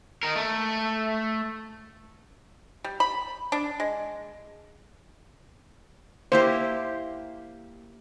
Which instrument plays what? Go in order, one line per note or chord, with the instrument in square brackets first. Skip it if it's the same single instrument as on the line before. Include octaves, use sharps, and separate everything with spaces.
[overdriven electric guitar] D#4 A#4
A3
[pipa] G3
B5
D4
G#3
[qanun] A#3 E4 G4 [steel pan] C5